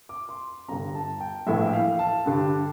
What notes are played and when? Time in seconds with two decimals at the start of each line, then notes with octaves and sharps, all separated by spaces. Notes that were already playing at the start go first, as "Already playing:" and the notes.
0.09 D6
0.29 C6
0.68 G1 G2 D3 A#5
0.95 A5
1.20 G5
1.47 A#1 A2 E3 E5
1.65 G5
1.73 F5
1.99 A5
2.26 G2 D3 G3